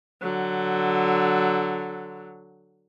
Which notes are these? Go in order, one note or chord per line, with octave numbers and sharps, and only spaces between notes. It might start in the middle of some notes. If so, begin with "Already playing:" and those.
D3 F#3